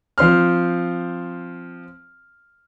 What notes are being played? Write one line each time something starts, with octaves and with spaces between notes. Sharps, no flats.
F3 C4 C6 F6